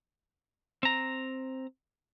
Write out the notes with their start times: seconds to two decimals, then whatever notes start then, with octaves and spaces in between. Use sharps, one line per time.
0.83 C4 A#5